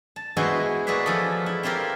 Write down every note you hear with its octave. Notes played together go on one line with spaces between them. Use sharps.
A5
E3 G#3 B3 E4 F#4 C5
A#3 F#4 G#4 B4 D5 E5
F3 G#4 A4
E4
C4 E4 F4 G4 A#4